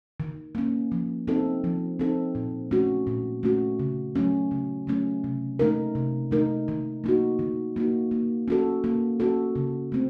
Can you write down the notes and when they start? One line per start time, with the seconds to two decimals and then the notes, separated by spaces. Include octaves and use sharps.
0.20 D#3
0.55 A#3 C#4
0.92 F3
1.27 C4 D#4 A4
1.64 F3
1.99 C4 D#4 A4
2.35 A#2
2.71 A3 C#4 F#4
3.07 A#2
3.43 A3 C#4 F#4
3.80 C#3
4.16 F#3 A3 C#4
4.51 C#3
4.87 F#3 A3 C#4
5.24 C3
5.59 D#3 A3 D#4 A#4
5.95 C3
6.31 D#3 A3 D#4 A#4
6.68 D#3
7.04 A#3 D#4 F#4
7.39 D#3
7.76 A#3 D#4 F#4
8.11 A#3
8.48 C#4 F#4 A4
8.84 A#3
9.20 C#4 F#4 A4
9.56 C#3
9.92 A3 C4